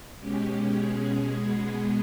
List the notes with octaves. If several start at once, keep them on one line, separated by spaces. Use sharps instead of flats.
B2 G#3 C#4 G4
B2 G#3 C#4 G#4
B2 G#3 B3